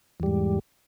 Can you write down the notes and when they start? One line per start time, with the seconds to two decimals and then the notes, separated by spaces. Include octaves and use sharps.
0.20 E2
0.23 G3
0.26 G#2